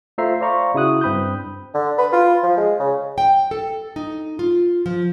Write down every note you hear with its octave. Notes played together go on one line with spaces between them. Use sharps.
A3 F4 C5 E5 A#5 C7
C5 D5 F5 A#5 B5 C#6
C#3 E4 F#4 D#6 F#6
G2 C4 B5 D#6 G6
D3
B4
F4
F3
G#3
C#3
G5
A4
D#4
F4
F3